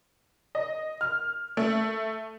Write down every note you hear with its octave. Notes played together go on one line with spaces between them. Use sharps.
D#5
F6
A3